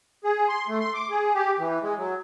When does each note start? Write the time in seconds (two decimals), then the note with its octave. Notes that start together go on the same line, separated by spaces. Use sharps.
0.24 G#4
0.49 C6
0.68 A3
0.80 C6
0.94 D6
1.10 G#4
1.34 G4
1.59 E3
1.82 G#3
1.97 F#3